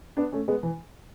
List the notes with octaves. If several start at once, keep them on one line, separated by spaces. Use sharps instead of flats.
B3 D4
A3 C#4
G#3 B3
E3